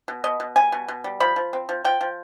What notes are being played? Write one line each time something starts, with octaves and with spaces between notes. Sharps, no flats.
B2
B2 D#5
B2
G3 G#5
B2
B2
G3
F3 B5
F3
C4
F3
F3 G5
F3